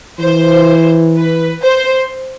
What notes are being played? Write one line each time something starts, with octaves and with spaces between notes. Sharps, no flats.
E3 C5
B4
C5